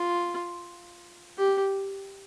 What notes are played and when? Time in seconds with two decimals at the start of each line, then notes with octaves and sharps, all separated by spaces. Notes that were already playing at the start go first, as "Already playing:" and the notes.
Already playing: F4
1.38 G4